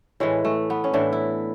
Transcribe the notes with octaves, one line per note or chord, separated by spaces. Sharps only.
A2 E3 G#3
A3
B3
C#4
A2 E3 D4
E4